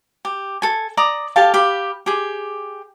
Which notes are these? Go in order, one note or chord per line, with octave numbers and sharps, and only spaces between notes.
G4
A4 G#5
D5 A#5 D#6
G4 A4 F5 A5
G4 F5 B5
G4 G#4